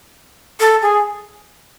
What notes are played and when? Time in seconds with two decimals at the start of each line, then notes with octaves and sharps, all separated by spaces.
0.60 A4
0.82 G#4